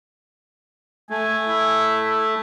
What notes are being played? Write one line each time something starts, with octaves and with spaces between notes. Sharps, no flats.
A3 G#5
E4